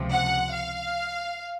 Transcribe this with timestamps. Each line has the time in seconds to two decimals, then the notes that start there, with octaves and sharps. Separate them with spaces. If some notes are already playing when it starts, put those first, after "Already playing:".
Already playing: C#2 C3 F3
0.11 F#5
0.53 F5